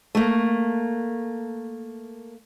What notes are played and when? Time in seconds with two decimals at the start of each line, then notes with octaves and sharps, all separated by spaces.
0.15 A3 A#3